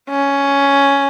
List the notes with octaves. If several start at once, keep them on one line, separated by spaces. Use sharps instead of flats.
C#4